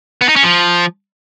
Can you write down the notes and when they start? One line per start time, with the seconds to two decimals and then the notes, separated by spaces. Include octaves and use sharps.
0.21 B3
0.29 D#4
0.36 C#4
0.44 F3